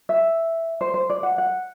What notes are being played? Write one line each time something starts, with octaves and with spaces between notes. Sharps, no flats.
E5
C5
C5
D5
F#5
F#5